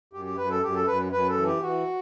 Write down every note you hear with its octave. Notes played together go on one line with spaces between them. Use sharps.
F#2 G4
G4
F#2 B4
A4
F#2 G4
A4
F#2 B4
F#2 B4
A4
E3
G4
E3 F#4